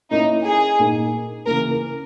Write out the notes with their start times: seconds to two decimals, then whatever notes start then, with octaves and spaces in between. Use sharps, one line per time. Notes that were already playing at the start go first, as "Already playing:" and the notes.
0.11 A#3 C#4 D#4 E4
0.46 G#4
0.79 A#2 A#3 D#4
1.47 C#3 E3 A#3 A#4